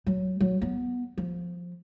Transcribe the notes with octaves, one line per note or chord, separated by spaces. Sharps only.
F#3
F#3
B3
F3